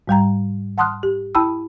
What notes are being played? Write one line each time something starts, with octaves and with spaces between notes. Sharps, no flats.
G#2 G3 G5 A#5
F#5 A5 C6 D#6 F6 F#6
G4
E4 G5 A5 B5 E6